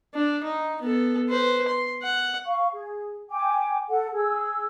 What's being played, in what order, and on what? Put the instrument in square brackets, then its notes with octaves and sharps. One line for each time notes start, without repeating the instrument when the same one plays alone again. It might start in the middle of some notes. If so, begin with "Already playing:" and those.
[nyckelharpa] D4
D#4
B3 A4
B4 C5
C6
F#5
[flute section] F5 C#6
G#4
G5 G#5 D6
A4 F#5
G#4 E6